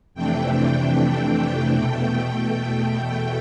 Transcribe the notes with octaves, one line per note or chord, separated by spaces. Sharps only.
F2 C3 E3 A3 D4 G5
E2 B2 A3 G5